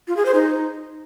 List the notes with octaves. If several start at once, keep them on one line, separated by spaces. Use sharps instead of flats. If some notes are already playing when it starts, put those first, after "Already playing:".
F4
G#4
C5
D#4